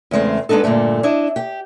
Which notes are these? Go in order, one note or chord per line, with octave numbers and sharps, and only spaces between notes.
E2 C#3 G#3 A3 C4
G#3 B3 D4 D#4 A4
G2 A#2 D3 A3
D4 E4 D#5
G4 G5